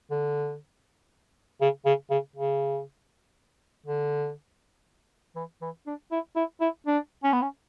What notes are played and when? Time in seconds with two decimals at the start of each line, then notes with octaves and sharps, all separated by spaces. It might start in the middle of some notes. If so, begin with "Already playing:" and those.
0.11 D3
1.61 C#3
1.86 C#3
2.10 C#3
2.36 C#3
3.86 D3
5.36 E3
5.62 E3
5.87 D4
6.11 E4
6.36 E4
6.61 E4
6.87 D4
7.24 C#4
7.33 B3
7.42 C#4